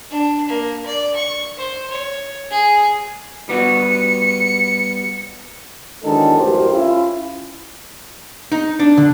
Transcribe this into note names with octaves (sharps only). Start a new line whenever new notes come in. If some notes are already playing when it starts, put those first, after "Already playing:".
D4
A#3
D5
C#6
C5
C#5
G#4
G3 B3 F#4 C#7
E2 D#3 F#3 G#3 D4 A4
A1 F#2 G4 A#4 C5
C#4 E4 F4
D#4
D4
D3